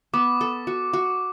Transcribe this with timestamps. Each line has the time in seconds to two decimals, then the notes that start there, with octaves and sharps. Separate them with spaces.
0.14 B3 D6
0.41 A4
0.67 F#4
0.93 F#4